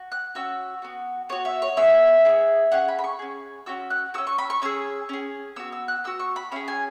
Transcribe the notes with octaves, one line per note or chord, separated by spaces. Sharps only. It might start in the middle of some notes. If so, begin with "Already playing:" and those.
Already playing: F#4
F#6
C#4 F#4 E6
B3 F#4
B3 F#4 C#5
E5
C#5
B3 E4 G#4 E5
B3 E4 G#4
C#4 G#4 F#5
B5
B5
C#6
C#4 G#4
C#4 F#4 E6
F#6
C#4 F#4 E6
C#6
B5
C#6
C#4 G#4 E6
C#4 G#4
B3 F#4 E6
E6
F#6
B3 F#4 E6
C#6
B5
C#4 E4 G#4 B5
G#5